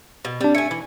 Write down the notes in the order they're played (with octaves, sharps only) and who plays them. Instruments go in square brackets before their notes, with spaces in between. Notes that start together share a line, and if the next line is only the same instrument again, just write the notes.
[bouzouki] B2
[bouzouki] G3 [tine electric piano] C4 D4
[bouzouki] A3 G#5 [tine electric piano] C#7
[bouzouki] E3